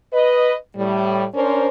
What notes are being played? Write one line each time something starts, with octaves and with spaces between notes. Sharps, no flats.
B4 D#5
A2 G3
C#4 D4 A#4 C5